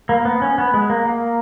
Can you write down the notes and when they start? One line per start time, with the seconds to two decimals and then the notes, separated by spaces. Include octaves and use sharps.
0.09 A#3
0.25 B3
0.42 C#4
0.58 B3
0.74 G#3
0.90 A#3
1.05 A#3